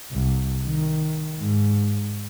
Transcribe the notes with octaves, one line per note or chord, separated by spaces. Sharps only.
C2
D#3
G#2